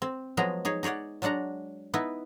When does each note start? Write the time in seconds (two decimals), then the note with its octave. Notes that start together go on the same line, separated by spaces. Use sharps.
0.02 C4
0.37 F3 F#3 G#3 B3 G#4 A#5
0.65 D#4 G#4 C#5
0.83 D#4 G#4 C#5 D5 F#5
1.22 F#3 G#3 D4 F#5 A#5
1.94 B3 D#4 E4 B4